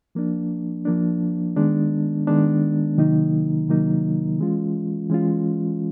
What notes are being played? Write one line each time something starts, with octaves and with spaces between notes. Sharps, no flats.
F3 A#3 D4
F3 A#3 D4
D#3 G#3 B3 D4
D#3 G#3 B3 D4
C3 D#3 F#3 A#3 D#4
C3 D#3 F#3 A#3 D#4
E3 G#3 C#4 F4
E3 G#3 C#4 F4